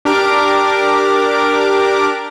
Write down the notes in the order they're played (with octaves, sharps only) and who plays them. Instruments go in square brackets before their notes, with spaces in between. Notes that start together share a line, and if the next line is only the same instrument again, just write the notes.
[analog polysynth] D4 G4 A#4 A#5 D6